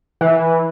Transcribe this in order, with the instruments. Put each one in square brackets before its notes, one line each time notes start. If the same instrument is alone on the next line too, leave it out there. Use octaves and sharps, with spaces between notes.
[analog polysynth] E3